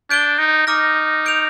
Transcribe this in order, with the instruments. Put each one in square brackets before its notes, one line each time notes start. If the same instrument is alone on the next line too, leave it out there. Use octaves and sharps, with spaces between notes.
[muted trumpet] D4 [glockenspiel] G6 D7 G7
[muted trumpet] D#4
[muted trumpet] D#4 [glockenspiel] D6 F6 A#6
[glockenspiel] G6 D7 F7